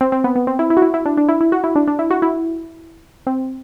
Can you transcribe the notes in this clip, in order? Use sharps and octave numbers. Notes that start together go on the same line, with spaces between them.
C4
C4
B3
B3
C4
E4
E4
F#4
E4
E4
D4
D4
E4
E4
F#4
E4
D4
D4
E4
F#4
E4
C4